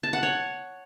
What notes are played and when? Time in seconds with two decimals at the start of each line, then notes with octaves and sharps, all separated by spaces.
0.03 A5
0.13 F#5
0.23 C#5